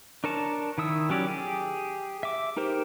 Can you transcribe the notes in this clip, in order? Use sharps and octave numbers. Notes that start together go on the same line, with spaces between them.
D4 A#4 C#5 A5
D#3 E4 D#6 E6
F#3 C#4 G4 D5
G4 G#4
E5 D6
D#4 G4 A#4 C5